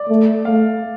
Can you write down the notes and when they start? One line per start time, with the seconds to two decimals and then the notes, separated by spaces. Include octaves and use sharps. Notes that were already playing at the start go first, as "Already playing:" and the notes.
Already playing: D5
0.09 A3
0.45 A3 F5